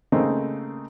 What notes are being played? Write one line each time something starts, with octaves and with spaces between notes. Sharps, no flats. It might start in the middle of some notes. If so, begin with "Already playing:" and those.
C#3 A3 A#3 C4 D#4